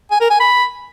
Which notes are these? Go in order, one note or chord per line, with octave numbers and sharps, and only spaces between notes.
G#5
A#4
G#5
B5